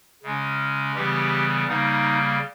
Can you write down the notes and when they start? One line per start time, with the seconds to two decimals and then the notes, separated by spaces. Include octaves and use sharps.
0.23 C#3 G#3 C#4
0.95 C#3 E3 G3 B3 G4
1.67 C#3 G3 A#3 D#4